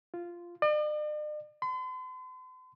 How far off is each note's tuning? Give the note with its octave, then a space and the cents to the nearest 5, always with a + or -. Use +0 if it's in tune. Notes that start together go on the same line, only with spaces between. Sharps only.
F4 -10
D5 +45
C6 -45